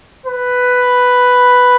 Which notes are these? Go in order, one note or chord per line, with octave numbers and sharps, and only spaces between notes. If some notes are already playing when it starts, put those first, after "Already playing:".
B4